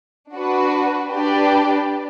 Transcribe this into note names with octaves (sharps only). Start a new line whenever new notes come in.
D4 F#4 B4
D4 G4 B4 D5